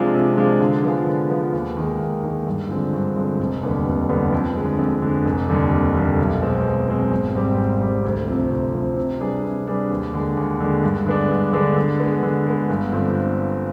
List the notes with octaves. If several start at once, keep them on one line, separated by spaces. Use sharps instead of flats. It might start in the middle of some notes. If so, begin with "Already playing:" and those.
Already playing: C3 F3 G#3 D4 F4
C3
F3 G#3 D4 F4
D3
F3 B3 F4 G#4
D3
F3 B3 F4 G#4
D#2
D#3 G#3
D#2
D#3 G#3
G2
D3 F3 G#3 C4
G2
D3 F3 G#3 C4
F1
D#2 D3 G3 B3
F1
D#2 D3 G3 B3
F2
D3 G#3
F2
D3 G#3
F1
D#2 D3 G3
F1
D#2 D3 G3
B1
B2 G#3 C4
B1
B2 G#3 C4
G#1
G#2 G3 C4 G4
G#1
G#2 G3 C4 G4
D2
C3 F3 C4
D2
C3 F3 C4
C3
G3 D4 G#4 B4
C3
G3 D4 G#4 B4
D#2
D3 G#3
D#2
D3 G#3
G2
D3 G#3 B3 D4
G2
D3 G#3 B3 D4
D3
G#3 B3
D3
G#3 B3
G1
G2 D3 F3 C4